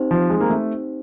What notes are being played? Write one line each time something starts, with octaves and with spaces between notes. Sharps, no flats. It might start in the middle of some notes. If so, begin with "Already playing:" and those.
Already playing: C4 D#4 G4 C5
F3
G#3
A#3
A3